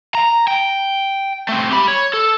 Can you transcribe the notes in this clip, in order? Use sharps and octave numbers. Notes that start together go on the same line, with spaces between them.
A#5
G5
A3 C4
G4 B5
C#5
A4